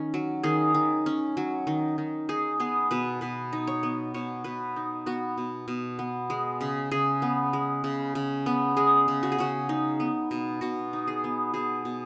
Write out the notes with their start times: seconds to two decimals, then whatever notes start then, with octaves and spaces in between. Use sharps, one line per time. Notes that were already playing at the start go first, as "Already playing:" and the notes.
Already playing: D#3 C#4
0.14 F#3
0.43 D#3 G#4
0.74 D#3
1.06 C#4
1.37 F#3
1.67 D#3
1.98 D#3
2.29 D#4 G#4
2.60 B3 G#4
2.91 B2 B4
3.21 B2 B4
3.53 D#4
3.67 C#5
3.83 B3
4.14 B2 C#5
4.44 B2 B4
4.76 D#4
5.06 B3 F#4
5.38 B2
5.68 B2
5.99 B3
6.30 G#3
6.61 C#3
6.91 C#3 G#4
7.22 B3
7.53 G#3
7.84 C#3
8.15 C#3
8.46 B3
8.77 G#3 G#4
9.08 C#3
9.23 F#4
9.32 G#4
9.38 C#3 F#4
9.69 D#4
10.00 B3
10.31 B2
10.61 B2 F#4
10.93 D#4
11.07 G#4
11.24 B3
11.54 B2 G#4
11.85 B2